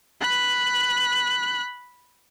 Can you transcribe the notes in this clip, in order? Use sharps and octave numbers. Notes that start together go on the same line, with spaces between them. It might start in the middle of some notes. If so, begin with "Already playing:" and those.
B5 F#6